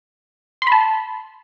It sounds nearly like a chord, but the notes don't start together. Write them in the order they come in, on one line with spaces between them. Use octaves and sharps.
C6 B5 A5